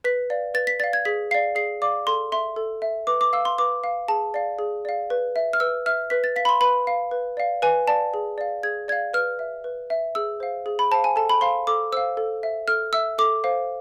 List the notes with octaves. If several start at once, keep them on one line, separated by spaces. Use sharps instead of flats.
B4 B6
D5 F5
B4 A6
B6
D5 F5 A6
G#6
G#4 B6
D5 F5 C7
G#4 C7
D5 F5 D6
A4 C6
E5 C6
A4
E5
B4 D6
D6
F5 E6
C6
B4 D6
F5
G#4 A5
D5 F5
G#4
D5 F5
B4
E5
F6
B4 E6
E5 F6
B4 B6
A6
F5 B6
B5
C6
B4 B5
F5
B4
D5 F5
B4 G#5
D5 F5 A5
G#4
D5 F5
G#4 G#6
D5 F5 G#6
B4 F6
E5
B4
E5
G#4 E6
C5 F5
G#4
B5
C5 F5 A5
G#5
A4 A5
B5
C5 F5 C6
A4 D6
C5 F5 E6
A4
E5
A4 F6
E5 E6
A4 D6
C5 F5